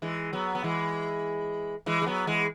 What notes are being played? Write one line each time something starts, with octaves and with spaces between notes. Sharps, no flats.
E3 G#3
F#3 B3
B3
E3 G#3
E3 G#3
G#3
F#3 B3
E3 G#3